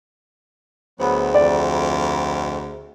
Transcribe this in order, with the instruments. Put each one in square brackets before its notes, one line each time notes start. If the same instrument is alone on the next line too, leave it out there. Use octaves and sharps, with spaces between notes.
[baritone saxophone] D2 [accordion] F#3 B3 [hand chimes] G#4 C5
[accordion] F2 [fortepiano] D5